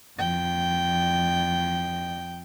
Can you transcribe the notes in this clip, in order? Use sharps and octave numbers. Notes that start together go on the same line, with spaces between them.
F2 G5